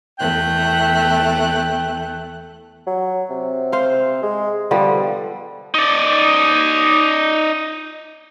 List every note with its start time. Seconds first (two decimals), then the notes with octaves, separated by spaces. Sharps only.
0.19 E2 A3 G5 F#6
2.87 F#3
3.30 C3
3.72 C5 F5
4.22 G#3
4.71 D3 F3 G3 B3
5.74 D#4 D5